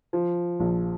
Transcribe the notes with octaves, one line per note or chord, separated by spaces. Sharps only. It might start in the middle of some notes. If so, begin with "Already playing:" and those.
F3
A#1